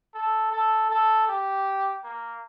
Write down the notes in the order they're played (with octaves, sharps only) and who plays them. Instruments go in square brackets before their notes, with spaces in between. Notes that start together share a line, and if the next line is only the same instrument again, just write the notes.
[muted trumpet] A4
A4
A4
G4
A#3